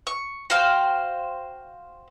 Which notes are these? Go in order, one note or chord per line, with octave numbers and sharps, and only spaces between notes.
C#6
F#4 C5 F5 G5